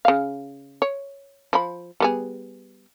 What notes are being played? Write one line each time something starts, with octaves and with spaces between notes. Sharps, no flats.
C#3 F5
C#5
F3 B5
G3 B3 G#4